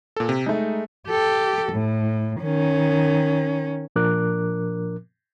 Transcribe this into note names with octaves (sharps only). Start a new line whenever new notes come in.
A#2 A4
C3
G#3 A3 D#4
G4 A4
A2
D#3 C#4
A#2 F3 D4 A#4 D6 F#6